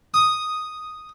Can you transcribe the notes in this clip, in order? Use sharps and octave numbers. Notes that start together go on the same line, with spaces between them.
D#6